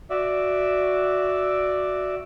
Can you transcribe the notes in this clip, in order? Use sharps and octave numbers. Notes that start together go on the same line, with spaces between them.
F#4 D5 E5